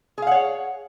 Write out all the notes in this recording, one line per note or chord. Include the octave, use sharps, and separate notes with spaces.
G#4 C#5 F5 F#5